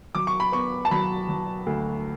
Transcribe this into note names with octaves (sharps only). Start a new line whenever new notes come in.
F#3 D6
C#6
B5
B3 C#6
A5
F#3 B5
F#3
D2